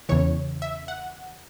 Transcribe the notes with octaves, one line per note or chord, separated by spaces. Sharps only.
E2 C#3 E3 C#5
E5
F#5